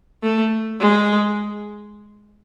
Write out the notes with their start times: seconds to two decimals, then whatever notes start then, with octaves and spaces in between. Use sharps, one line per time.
0.23 A3
0.80 G#3